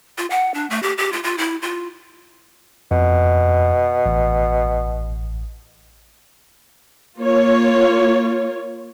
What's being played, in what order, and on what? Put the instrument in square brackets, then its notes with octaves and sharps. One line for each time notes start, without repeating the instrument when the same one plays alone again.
[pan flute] F4
F#5
D4
A3
G4
G4
F4
F4
E4
F4
[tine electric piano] F2 [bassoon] B2
[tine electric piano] A1
[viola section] A#3 F4 C#5